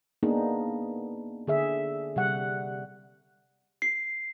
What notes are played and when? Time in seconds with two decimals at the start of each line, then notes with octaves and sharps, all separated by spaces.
0.23 A#3 B3 D4 D#4 G#4
1.47 D3 G#4 E5
2.16 C3 G3 F#5
3.82 C7